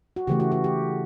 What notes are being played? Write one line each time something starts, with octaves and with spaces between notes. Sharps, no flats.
F#4
C#3 E3 A3 G4
F#4
F#4
G4